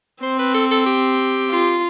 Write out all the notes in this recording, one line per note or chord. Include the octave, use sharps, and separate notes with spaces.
C4 C5
B4
A4
A4
G4
F4